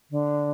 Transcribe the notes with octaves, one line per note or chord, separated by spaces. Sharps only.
D3